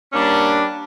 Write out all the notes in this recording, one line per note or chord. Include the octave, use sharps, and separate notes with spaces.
G3 A#3 C#4 D4